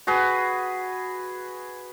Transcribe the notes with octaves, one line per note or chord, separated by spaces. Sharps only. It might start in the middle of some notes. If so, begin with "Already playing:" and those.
F#4 G#4 B4